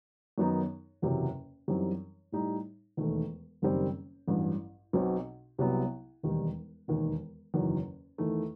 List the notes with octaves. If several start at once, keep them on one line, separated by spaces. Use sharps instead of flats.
F#2 D#3 F#3 B3 D#4
F#1 E2 C3 F#3
F#2 E3 G3 C4 D#4
A2 G3 D#4
E1 D#2 D#3 A3
F#1 F#2 D#3 G3 C4
A1 G2 F#3
B1 B2 F#3 C4
C2 C3 F#3 B3
E1 D#2 D#3 G3 D#4
E1 D#2 D#3
F#1 E2 D#3 F#3
E2 D#3 A3